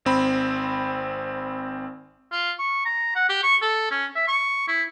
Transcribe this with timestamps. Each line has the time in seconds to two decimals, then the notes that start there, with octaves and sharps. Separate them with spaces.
0.05 G#1 C4 B5
2.32 F4
2.59 C#6
2.85 A#5
3.15 F#5
3.29 G4
3.43 C#6
3.62 A4
3.91 C#4
4.15 E5
4.28 C#6
4.68 E4